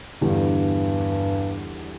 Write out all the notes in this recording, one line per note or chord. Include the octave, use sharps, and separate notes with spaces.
E2 G2 D3 G3